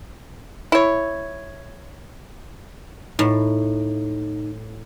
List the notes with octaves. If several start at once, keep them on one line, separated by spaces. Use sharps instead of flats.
E4 C#5
A2 D#4